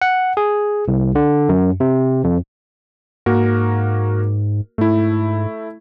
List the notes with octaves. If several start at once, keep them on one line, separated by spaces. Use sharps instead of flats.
F#5
G#4
C2
D3
F#2
C3
F2
G#2 A#3 F#4 A#4
G#2 A3 E4